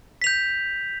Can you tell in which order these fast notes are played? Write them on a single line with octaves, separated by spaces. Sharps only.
B6 F7 G6